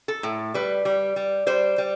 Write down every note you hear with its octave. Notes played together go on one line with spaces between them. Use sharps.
A4
A2
G3 B4
G3
G3
G3 C5
G3